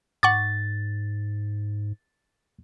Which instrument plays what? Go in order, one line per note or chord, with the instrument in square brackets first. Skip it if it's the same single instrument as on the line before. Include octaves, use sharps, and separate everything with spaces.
[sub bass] G#2 [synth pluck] F#5 C#6 D6 [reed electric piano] A6